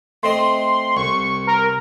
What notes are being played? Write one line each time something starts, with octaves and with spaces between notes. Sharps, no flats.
A3 C4 D#5 C6
C2 C#6
A#4